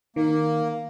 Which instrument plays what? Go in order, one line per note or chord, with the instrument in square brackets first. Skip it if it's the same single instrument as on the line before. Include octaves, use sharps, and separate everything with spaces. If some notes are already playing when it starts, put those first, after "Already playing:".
[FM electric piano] D#3 [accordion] A#3